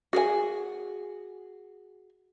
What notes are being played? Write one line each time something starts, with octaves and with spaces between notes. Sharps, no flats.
F#4 G#4 A4 G#5